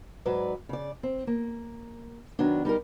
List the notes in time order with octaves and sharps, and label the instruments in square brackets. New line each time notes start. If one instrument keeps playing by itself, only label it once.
[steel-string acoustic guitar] G#2 F#3 B4 D5
C#3 D5
C4
A#3
D#3 F#3 B3 D4
G3 D#4 G4 A#4